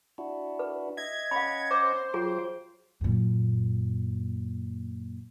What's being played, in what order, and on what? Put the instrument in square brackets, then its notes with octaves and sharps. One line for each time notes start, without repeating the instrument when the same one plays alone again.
[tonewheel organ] D4 E4 F#4
[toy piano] B4
[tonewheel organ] D#5 E5 [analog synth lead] G#6
[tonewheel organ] C#4 D#5 F#5 [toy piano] F5 B5
[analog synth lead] C5 [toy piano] D6
[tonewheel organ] F#3 F5 G5 [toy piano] F4 G#4
[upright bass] F#2 A#2